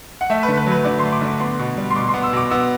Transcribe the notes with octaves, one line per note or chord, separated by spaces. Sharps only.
F#5
A3 E5
B4
D3
B4
F#3
B4
D3 D5
C6
A3
D6
D3
D6
B3 C6
B2
G3
C6
B2 D6
C6
B3
E6
B2 D6
B3 E6